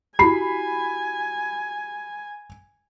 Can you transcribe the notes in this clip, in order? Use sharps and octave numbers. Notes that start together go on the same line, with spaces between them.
E4 F#4 G4 G#5 B5 C7